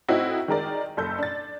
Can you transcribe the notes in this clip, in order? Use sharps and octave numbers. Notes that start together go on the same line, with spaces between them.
A2 C4 D#4 E4 F#4
D#3 G#3 A#4 D5
F#1 A4 G6
D4 A6